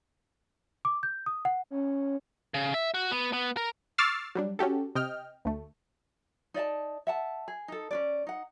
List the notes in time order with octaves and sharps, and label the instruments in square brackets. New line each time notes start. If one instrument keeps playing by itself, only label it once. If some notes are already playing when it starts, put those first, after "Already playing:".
[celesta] D6
G6
D#6
F#5
[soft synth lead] C#4
[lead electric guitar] C#3
E5
F#4
B3
B3
A#4
[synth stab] C#6 D6 E6 F6 A6 C7
F#3 G3 D4
C#4 F#4 G4 A4
C3 D#5 G5 F6
D2 A3
[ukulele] D#4 D5 E5 A5
E5 F#5 A5
G#4
D#4 A4
C#4 D4 D5
D#4 F#5